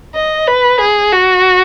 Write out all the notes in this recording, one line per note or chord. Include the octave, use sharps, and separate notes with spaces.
D#5
B4
G#4
F#4